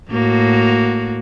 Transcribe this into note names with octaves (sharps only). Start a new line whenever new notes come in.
A2 A#3 F#4